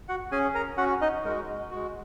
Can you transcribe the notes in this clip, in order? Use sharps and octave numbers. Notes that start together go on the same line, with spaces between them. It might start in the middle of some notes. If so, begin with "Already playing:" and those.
F#4 F#5
C#4 G#4 G#5
A#4 A#5
C#4 F#4 F#5
D#4 D#5
G#3 F#4 A#4
G#3 F#4